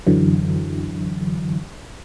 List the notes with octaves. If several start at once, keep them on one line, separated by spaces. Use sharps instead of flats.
F#2 D3 E3 F#3